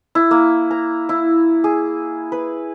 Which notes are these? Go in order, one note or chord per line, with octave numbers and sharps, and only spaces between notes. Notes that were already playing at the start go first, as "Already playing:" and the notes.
E4
A#3
A#5
E4
G#4
B4